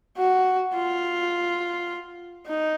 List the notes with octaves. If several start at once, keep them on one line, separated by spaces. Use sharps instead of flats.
F#4
F4
D#4